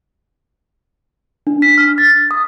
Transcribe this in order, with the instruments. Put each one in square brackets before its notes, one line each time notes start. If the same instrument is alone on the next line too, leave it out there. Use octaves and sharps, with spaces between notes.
[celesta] D4
B6
F6
A6
D#6